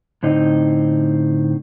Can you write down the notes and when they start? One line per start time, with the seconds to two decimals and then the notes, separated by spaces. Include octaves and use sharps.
0.23 A2 D3 C4 D#4 D#5